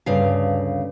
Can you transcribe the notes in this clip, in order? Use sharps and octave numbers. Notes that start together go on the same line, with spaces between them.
D2 G2 C#3 F5